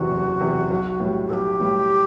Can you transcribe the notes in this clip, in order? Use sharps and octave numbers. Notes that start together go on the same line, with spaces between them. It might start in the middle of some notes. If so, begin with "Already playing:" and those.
Already playing: F#1 E2 C3 E3 F#4
F#1
E2 C3 E3
B1
A2
G3
B1 G4 A4
A2 G3